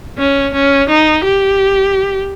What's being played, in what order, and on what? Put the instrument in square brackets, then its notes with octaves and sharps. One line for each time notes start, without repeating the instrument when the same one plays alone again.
[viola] C#4
C#4
D#4
G4